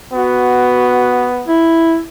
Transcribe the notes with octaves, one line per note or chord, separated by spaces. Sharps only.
B3 F#4
E4